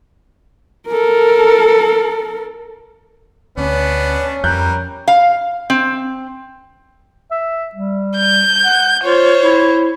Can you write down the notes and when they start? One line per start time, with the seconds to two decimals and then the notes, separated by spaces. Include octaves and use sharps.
0.88 A4 A#4
3.57 D2 B3 C#4 D4
4.44 F2 G3 A#4 F#6 G6
5.08 F5
5.70 C4
7.31 E5
7.75 G3
8.17 G6
8.64 F#5
9.04 F4 C5 C#5
9.44 E4